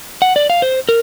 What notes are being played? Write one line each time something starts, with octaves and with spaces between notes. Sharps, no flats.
F#5
D5
F5
C5
A#4